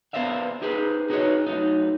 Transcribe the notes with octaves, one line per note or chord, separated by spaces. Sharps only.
B3 A#4 C5 D5 E5 F5
D#4 G4 G#4 B4 C5
D#4 F#4 G#4 B4 C#5 D#5
F#3 A3 D#4